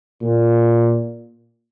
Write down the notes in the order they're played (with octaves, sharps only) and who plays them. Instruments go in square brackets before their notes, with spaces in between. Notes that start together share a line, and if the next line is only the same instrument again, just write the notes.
[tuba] A#2